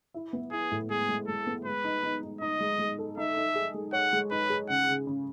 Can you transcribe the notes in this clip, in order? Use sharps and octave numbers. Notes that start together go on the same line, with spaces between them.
E4
B3
E4 G#4
A2
G#3 G#4
G#3
G#3 A4
B3
G#3 B4
D#4
D#4
D#4
D#4 D#5
G#3
G#3
A4
D#4 E5
D#4
G#4
G#3
C#5 F#5
G#3
D#4 B4
G#4
C#3 F#5
C#3
C#3